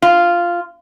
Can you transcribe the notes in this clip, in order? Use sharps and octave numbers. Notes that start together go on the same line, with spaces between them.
F4